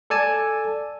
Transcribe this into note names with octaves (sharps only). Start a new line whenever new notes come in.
A4 D5 G#5 A5